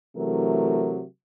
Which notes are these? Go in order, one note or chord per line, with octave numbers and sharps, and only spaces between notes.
C3 E3 F#3 A3 A#4